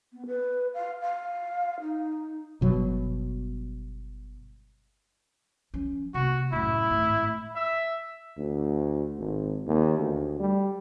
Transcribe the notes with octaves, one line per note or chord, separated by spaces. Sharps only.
B3
B4
F5
F5
D#4
G1 B2 F#3
F3 C#4
C3 A#3 F#4
F#2 A2 E4
G#1 A2
E5
D2
G#1
D#2
D2
G3